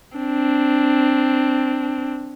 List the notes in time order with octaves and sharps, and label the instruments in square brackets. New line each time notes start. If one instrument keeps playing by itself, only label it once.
[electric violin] C4 D4